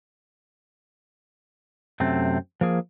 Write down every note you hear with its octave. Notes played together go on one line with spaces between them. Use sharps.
F#2 C3 A3 C4
F3 A#3 G#4